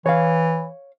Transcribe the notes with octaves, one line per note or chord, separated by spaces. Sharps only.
E3 C#5 F5